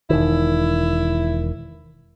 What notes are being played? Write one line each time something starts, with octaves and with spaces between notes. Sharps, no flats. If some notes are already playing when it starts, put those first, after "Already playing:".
E1 D#3 E4